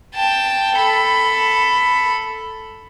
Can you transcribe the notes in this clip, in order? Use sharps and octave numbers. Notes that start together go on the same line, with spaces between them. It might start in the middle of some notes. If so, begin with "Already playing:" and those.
G5 A5
A4 B5